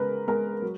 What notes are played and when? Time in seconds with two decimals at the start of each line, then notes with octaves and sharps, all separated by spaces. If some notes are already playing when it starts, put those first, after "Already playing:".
Already playing: C#3 G#3 A#4 B4
0.27 G#3 A#4
0.62 F#3